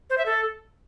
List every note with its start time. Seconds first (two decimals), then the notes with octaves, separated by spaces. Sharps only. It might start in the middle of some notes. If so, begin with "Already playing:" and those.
0.10 C5
0.18 E5
0.26 A4